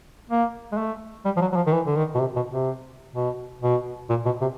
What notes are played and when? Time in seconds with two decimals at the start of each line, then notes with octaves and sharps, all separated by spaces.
0.30 A#3
0.72 G#3
0.78 A3
1.25 G3
1.36 F3
1.41 F#3
1.52 F#3
1.56 F3
1.66 D#3
1.73 E3
1.86 D3
1.96 D#3
2.15 B2
2.19 C3
2.36 B2
2.51 C3
3.15 B2
3.62 B2
4.10 A#2
4.25 B2
4.41 C3